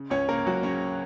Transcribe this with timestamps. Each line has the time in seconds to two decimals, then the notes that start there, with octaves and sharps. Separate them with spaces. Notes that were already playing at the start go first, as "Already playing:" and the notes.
Already playing: C#3
0.10 C#2 C#4 C#5
0.28 C#3 A#3 A#4
0.46 C#2 F#3 F#4
0.63 C#3 C#4 C#5